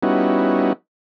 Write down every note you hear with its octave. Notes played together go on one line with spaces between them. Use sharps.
G3 B3 C#4 D#4 E4 F#4